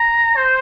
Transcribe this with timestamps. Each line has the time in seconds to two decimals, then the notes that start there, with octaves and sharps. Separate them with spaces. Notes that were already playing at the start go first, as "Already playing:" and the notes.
Already playing: A#5
0.37 C5